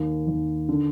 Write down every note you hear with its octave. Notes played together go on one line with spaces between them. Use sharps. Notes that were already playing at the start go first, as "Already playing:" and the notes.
Already playing: D#2
D#2
D3